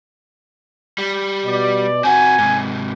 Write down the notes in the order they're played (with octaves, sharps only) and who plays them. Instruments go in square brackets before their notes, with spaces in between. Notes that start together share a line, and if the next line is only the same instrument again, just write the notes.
[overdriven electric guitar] G3
[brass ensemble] B2 D5
[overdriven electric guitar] C4 F#4 [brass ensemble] G#5
[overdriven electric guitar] G#2 C3